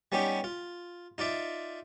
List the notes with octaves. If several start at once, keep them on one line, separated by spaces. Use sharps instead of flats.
G3 B3 C#4 D#4 G4
F4
D#4 F4 D5 E5